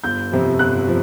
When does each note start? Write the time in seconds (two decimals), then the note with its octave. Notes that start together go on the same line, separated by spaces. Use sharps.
0.04 G1 G6
0.32 F2 C3 F3
0.59 G1 F#6
0.88 F3